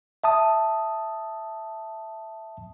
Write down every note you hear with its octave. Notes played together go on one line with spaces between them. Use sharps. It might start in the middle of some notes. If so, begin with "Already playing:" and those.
E5 A5 D#6